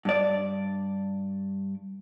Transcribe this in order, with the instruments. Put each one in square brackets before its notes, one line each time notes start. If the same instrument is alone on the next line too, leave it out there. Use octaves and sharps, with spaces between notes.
[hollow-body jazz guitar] G2 D5